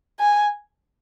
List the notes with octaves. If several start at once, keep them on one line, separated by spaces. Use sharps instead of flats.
G#5